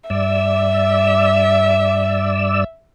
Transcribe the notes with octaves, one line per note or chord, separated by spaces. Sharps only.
G2 D5 E5 E6